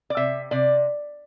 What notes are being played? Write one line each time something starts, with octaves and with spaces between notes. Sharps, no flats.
D5
C3 E5
C3 D5